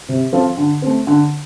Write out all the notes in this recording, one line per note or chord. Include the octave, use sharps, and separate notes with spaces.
C3
F3 C4 F4 A4
D3
A3 C4
D3